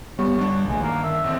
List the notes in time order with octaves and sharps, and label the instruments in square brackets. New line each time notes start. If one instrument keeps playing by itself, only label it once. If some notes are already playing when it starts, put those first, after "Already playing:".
[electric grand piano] G3 [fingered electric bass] B3 [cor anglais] C#5
[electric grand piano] G1 D4 [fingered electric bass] G3
[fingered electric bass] A#1 D3 A3 [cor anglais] G#3
[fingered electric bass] D#3 [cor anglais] A#3
[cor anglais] E5
[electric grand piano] A1 D3 C4